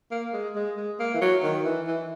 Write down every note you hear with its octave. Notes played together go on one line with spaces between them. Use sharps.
A#3
G#3
G#3
G#3
A#3
E3
F#3
D#3
E3
E3